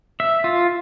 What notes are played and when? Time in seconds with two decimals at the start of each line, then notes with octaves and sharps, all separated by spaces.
0.20 E5
0.44 F4